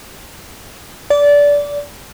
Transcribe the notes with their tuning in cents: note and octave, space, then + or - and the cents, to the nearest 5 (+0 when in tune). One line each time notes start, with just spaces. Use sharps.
D5 -20